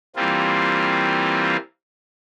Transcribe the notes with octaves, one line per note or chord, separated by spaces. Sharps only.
E3 G3 A#3 C4 F4